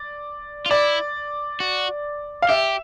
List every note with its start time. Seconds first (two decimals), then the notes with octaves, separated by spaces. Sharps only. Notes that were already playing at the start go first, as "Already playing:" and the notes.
Already playing: D5
0.66 F4
0.71 E4 D5
1.60 F#4
2.42 F5
2.49 G4 E5